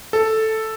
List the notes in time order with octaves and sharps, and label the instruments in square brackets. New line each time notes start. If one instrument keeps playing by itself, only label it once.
[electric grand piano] A4